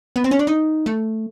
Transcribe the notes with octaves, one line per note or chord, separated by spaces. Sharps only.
B3
C4
C#4
D4
D#4
A3